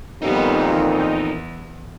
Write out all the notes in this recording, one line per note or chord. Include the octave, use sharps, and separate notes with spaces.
F2 A#2 D#3 G3 B3 D#4
E2